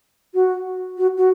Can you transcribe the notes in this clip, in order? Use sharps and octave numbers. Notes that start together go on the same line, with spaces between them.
F#4
F#4
F#4